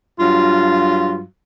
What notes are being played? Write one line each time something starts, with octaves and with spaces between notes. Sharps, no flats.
G2 F#3 F4